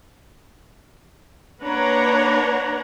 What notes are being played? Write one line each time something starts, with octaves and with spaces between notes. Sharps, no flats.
A#3 D4 B4 C#5 F#5 A#5